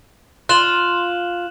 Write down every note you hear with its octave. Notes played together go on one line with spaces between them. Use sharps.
F4 F#6 E7 F#7